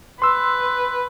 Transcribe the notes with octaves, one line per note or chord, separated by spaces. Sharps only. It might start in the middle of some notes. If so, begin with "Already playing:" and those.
B4 C6 E6